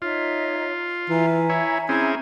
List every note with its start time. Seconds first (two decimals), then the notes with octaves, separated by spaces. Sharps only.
0.02 D#4 F4 C#5 E5
1.09 E3 E5 G#5 A#5
1.49 E4 C#5
1.89 C4 C#4 E4 G#4